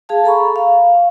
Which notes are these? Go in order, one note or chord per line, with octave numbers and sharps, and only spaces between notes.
G#4 F5 A5
A4 A#5 B5 C#6
F5